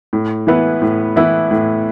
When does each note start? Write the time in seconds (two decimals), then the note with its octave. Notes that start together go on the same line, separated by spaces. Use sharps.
0.13 A2
0.47 E3 B3 E4 B4
0.82 A2
1.16 E3 B3 E4 B4
1.51 A2